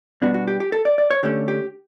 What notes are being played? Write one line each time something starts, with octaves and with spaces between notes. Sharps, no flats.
B2 G3 B3 D4 F#4
F#4
G4
G4
A4
D5
D5
C#5
D3 A3 C#4 G4
G4